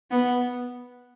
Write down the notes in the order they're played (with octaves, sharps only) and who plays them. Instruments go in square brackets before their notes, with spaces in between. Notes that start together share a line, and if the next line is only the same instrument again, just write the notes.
[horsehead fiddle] B3